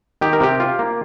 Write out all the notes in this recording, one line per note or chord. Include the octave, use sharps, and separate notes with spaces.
D#3 G4
A#4
C3 G4
F4
A#3